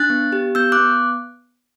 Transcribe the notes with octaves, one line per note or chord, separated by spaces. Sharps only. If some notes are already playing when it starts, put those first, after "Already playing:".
Already playing: D4 F#6 A6
B3
G4
B3 E6 G6
D6 F#6
B3